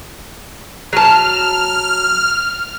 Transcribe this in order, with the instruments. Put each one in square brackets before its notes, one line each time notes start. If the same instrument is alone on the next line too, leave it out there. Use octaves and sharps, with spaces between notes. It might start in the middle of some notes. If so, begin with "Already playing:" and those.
[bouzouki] F#3 A5 [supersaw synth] F6